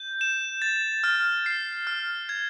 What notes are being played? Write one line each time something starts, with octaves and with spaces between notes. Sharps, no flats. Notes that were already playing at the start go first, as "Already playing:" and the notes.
Already playing: G6
E7
A6
F6
C7
F6
G#6